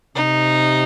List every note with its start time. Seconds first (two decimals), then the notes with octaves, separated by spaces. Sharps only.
0.16 C3 D#4